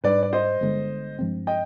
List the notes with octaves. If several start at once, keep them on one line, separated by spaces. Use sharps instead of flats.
G#2 G3 B3 D4 B4 D5
D5
C5 D#5
G1 G2 D3 G#3
G2 F3 G#3 C4
D#5 G5